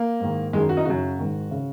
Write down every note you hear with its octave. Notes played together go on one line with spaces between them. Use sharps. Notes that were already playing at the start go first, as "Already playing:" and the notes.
Already playing: A#3
G#2 D#3
F#2 D#3 G#3
F#4
D#4
F#2 C#3 F#4
G#2 D#3
C#3